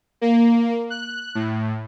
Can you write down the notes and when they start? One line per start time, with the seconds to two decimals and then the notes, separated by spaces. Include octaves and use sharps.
0.21 A#3
0.90 F#6
1.35 A2